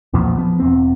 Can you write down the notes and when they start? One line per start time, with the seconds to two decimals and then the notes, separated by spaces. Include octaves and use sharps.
0.13 B1 E2 A#2 F3
0.37 F3 B3
0.60 E1 E2 C4